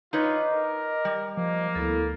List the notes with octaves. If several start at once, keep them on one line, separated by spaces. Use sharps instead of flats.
D#4 F4 B4 C#5 D#5 D6
A#4
G3
F3 A#3
D2 B3 E4 A4